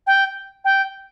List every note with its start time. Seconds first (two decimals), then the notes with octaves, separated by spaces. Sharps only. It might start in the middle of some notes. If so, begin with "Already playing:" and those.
0.07 G5
0.65 G5